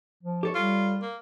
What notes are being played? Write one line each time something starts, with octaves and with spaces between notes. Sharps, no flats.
F3
G4 A4 C#5
G3 F4
A#3